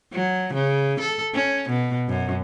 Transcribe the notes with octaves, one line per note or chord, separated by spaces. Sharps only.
F#3
C#3
A4
C#4
B2
F#2